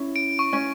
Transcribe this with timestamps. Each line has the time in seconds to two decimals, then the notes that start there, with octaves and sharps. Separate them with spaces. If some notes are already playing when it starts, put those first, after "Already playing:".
Already playing: C#4 E4
0.16 D7
0.39 C#6
0.53 C#4